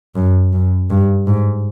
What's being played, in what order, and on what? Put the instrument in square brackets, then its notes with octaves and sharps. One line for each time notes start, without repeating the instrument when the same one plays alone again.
[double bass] F#2
F#2
G2
G#2